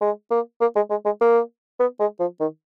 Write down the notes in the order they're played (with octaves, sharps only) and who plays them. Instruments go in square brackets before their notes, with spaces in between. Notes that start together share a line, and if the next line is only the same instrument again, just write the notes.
[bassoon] G#3
A#3
A#3
G#3
G#3
G#3
A#3
B3
G#3
F3
D#3